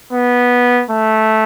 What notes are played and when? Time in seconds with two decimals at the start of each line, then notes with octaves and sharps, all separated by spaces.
0.13 B3
0.90 A3